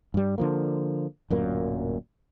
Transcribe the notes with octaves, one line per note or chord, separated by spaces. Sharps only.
G2 G3
D3 F3 A#3
D1 F#2 A#2 A#3